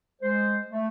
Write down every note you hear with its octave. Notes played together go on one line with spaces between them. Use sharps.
G#3 C5
A3